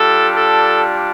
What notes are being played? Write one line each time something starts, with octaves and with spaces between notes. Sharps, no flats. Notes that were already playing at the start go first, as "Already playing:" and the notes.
Already playing: G3 D4 F4 A4
A4